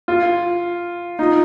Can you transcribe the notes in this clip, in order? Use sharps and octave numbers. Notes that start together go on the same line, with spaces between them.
F4
D#4 F4